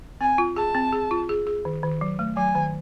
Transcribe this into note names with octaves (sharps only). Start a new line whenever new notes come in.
C4 G#5
F4
G#4 A5
C4
G#4
F4
G#4
G#4
D#3
D#3
F#3
A3
F#3 G#5
D#3